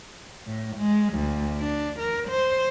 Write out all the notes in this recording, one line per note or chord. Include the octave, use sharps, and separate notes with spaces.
A2
G#3
D2
D4
A#4
C5